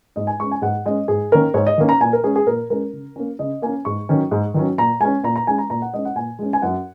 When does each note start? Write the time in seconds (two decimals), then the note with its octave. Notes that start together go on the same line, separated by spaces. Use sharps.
0.16 G#2 D#5
0.27 G#5
0.39 G#3 C#4 C#6
0.51 G#5
0.62 G#2 F#5
0.86 G#3 C#4 D#5
1.08 G#2 G#4
1.32 D#3 A#3 C#4 A#4
1.54 G#2 C#5
1.67 D#5
1.78 D#3 A#3 C#4
1.89 A#5
2.00 A#2 G#5
2.13 A#4
2.24 G#3 C#4 G#4
2.36 G#4
2.47 A#2 A#4
2.70 G#3 C#4 A#4
2.93 C#3
3.16 A#3 C#4
3.39 C#3 D#5
3.62 A#3 C#4 G#5
3.85 G#2 C#6
4.09 D#3 F#3 C#4
4.31 G#2
4.54 D#3 F#3 C#4
4.78 A#2 A#5
5.00 G#3 C#4 G#5
5.24 A#2 A#5
5.36 A#5
5.47 G#3 C#4 G#5
5.58 A#5
5.70 A#2 A#5
5.82 F#5
5.94 G#3 C#4 D#5
6.05 F#5
6.16 A#2 G#5
6.39 G#3 C#4
6.53 G#5
6.62 F#2 F#5